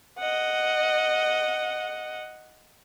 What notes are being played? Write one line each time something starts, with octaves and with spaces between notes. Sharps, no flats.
D#5 F#5